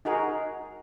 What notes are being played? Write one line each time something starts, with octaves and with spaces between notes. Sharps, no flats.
D#4 F#4 G#4 A#4